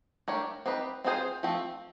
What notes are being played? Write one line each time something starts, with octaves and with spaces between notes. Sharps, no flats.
A3 D4 G4 A#4 C#5
C4 D#4 G4 B4
C4 F4 G#4 C5
F3 A3 C4